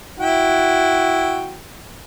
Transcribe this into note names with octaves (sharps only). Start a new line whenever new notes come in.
E4 F#4 G5